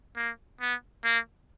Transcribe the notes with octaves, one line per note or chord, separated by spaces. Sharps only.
A#3
B3
A#3